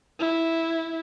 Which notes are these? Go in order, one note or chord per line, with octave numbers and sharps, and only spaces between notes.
E4